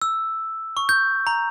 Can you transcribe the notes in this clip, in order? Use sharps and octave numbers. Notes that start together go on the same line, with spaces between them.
E6
C#6
G6
A#5